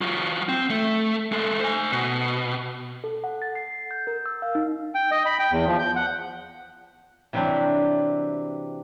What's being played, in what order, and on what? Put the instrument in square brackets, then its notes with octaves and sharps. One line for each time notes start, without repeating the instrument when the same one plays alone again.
[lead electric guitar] F#3 F4
C4
A3
G#3 A4
C5 G#5
B2
[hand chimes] A4
F#5
A6
C7
G6
A#4
E6
F5
D#4
[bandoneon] G5
D#5
B5
G5
E2
F3
G6
F#5
[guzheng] C3 E3 F#3 G3 C4 D4